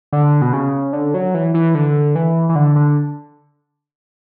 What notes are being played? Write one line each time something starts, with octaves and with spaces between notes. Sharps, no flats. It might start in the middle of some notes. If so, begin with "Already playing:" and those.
D3
B2
C#3
D3
F#3
E3
E3
D3
E3
E3
D3
D3